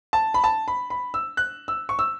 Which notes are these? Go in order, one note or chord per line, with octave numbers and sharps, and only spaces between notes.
A5
B5
A5
B5
B5
E6
F#6
E6
C#6
E6